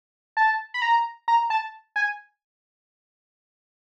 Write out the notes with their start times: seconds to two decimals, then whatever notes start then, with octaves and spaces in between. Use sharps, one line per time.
0.37 A5
0.74 B5
0.82 A#5
1.28 A#5
1.50 A5
1.96 G#5